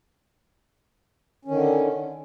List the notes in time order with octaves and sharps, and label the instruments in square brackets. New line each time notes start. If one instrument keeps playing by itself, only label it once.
[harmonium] C#4
D#3
D3